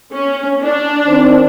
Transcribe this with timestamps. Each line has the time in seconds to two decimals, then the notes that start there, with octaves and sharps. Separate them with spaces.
0.11 C#4
0.62 D4
1.07 D#3 C4 C5